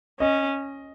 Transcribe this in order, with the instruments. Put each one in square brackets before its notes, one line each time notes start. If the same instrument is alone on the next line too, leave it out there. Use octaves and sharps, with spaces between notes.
[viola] C#4 [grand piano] D#5